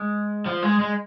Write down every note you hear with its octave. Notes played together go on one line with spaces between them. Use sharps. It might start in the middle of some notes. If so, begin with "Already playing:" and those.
Already playing: G#3
F3
G#3
G#3